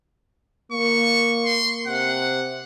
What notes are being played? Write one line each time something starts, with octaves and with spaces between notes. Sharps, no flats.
A#3 C#6
C6
C3 F#5